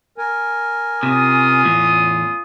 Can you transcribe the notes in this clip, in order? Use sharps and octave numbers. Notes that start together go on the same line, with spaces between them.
A#4 G#5
C3 C#4 F4 D#6
E2 A2